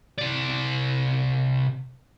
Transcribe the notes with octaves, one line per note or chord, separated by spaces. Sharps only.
C3 D5